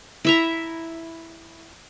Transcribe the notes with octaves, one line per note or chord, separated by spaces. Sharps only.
E4 E5 A#5